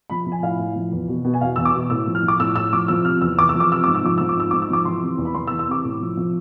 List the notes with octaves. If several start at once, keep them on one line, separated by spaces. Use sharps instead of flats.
F3 B5
F3
G#5
A2 F5
A2
F3
E2
B2
B2
G#5
E2 F5
E2 E6
D6
B2
A2 E6
F3
F6
F3
D6
A2 E6
A2 E6
F3 D6
F3 E6
C3 F6
E2 E6
E2 D6
E6
F3
D6
C3 E6
G#2 D6
E6
F3 D6
F3 E6
D6
G#2 E6
G#2 D6
E6
F3 D6
E3 C6
C3
E2
B5
E2 C6
E6
E3
E6
C3 D6
A2
F3
F3